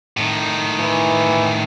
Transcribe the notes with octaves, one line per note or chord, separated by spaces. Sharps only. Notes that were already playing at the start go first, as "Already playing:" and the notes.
A2 D#3
E3